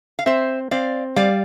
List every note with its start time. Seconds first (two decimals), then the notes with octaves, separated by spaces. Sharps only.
0.19 F5
0.26 C4 C5 E5
0.71 C4 D5 F5
1.16 G3 D5 F5